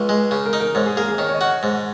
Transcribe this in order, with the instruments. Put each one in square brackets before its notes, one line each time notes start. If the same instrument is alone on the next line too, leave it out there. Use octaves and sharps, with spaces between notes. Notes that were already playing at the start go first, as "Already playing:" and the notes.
Already playing: [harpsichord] C#2
G#3
C#3
[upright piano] A#4
[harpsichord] D#4
[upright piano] A#4
[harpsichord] G#2 [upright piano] C#5
[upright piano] G#4
[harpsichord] A#3 [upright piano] G#4
[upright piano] G#4
[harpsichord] D#3 [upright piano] C#5
[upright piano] C#5
D#5
[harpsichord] F#4
[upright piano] F#5
[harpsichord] G#2